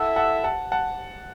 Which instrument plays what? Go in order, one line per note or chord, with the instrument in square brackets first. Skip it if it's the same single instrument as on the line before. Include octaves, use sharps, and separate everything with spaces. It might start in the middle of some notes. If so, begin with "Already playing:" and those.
Already playing: [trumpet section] E4 A4 E5 [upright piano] F#5 A5
[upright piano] F#5 A5
F#5 A5
F#5 A5